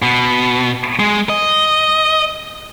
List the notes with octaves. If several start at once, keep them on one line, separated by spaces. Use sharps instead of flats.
B2
G#3
D#5